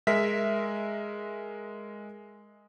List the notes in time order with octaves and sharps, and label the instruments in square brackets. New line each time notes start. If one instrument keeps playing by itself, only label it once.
[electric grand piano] G#3 A#4 E5 B6